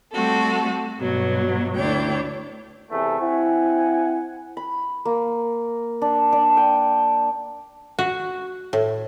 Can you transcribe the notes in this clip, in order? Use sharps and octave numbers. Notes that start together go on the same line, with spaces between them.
G3 A3 C4 F#4 A4
G2 B2 F#3
D2 D4 E4 C#5 G5
E2 C3 A3
C4 E4 F#5 G#5
B5
A#3
D4
D4
G5
F#4
A2